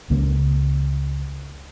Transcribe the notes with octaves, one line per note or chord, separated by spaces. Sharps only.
C#2 C#3 A#3